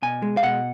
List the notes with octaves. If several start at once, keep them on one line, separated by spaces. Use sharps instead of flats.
B2 G#5
G#3
F5
B2 F#5